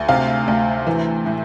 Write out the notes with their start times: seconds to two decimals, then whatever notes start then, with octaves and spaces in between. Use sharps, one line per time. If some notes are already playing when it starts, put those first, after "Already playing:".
Already playing: D2
0.09 C3 F5
0.48 D2
0.87 E3
1.26 A2